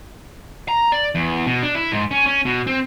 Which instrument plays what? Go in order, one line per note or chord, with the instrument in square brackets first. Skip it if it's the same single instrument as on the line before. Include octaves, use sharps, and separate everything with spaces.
[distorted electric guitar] A#5
D5
E2
B2
D4
E4
G#2
C#4
C#4
B2
C4